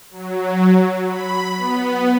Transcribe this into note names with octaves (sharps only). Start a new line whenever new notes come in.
F#3
B5
B3